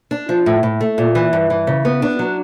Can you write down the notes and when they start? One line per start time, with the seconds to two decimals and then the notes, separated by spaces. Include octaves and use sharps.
0.11 D4
0.29 F3
0.46 A2
0.63 A2
0.81 A3
0.98 A#2
1.15 E3
1.33 G2
1.50 E3
1.67 C#3
1.85 B3
2.02 D4
2.19 F#3